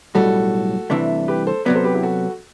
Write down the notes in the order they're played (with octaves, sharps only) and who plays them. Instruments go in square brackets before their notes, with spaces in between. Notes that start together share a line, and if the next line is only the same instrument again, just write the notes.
[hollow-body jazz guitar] B1 A2 G3 [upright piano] F#4 A4
[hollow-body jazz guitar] C2 C3 E3 A3 D4
[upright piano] G4 B4
A4 C5
[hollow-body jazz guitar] C3 F#3 B3 [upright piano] B4 D5
[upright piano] A4 C5
G4 B4
E4 G4
F#4 A4